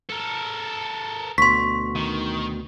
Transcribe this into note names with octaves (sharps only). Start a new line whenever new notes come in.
A4 A#4
D2 B2 C6 C#6 B6
D#3